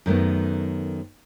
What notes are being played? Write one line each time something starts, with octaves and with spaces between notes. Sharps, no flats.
F#2 D#3 A3 B3